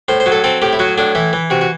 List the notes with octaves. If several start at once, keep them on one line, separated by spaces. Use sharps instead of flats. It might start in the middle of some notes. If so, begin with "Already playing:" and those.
A2 C5
C5
F#3
A4
C4 A4
A2 G4
E4
F#3 F#4
A2 D4
E3 E4
E3
C3 F#4
F#4